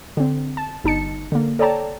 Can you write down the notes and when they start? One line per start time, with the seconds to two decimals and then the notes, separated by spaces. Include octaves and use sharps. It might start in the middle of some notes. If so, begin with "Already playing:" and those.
0.17 D3 C4
0.57 A5
0.84 G1 D#4 A5 C#7
1.32 D3 A#3
1.59 A4 C#5 D5 G5 A5 A#5